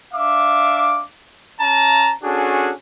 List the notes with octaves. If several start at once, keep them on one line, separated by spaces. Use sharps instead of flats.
D4 E5 F5 D6
C#4 A5 A#5
C#4 D4 F#4 G#4 A4